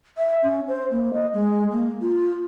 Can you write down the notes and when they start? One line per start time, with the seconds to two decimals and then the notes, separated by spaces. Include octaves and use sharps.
0.18 E5
0.43 C#4
0.68 C5
0.91 A#3
1.14 D#5
1.33 G#3
1.71 A#3
2.01 F4